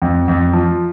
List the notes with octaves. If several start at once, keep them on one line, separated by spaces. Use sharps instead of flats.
F2
F2
F3